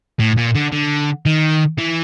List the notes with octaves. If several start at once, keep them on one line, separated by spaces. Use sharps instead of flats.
A2
A#2
D3
D3
D#3
E3